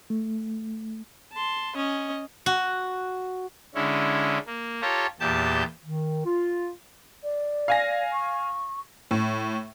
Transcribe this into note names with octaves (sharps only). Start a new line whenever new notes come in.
A3
A5 C6
C#4 D#5
F#4
D3 G#3 C#4 E4
A#3
F4 G4 A4 C#5 A#5
E2 A#2 G4 A5 G6
D#3
F4
D5
F5 G#5 A#6
C#6
A2